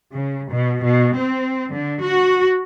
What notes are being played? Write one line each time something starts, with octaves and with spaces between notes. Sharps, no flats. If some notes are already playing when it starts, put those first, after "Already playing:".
C#3
B2
B2
C4
D3
F#4